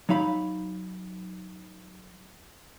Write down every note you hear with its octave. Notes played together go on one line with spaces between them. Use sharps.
F#3 D#4 F5 B5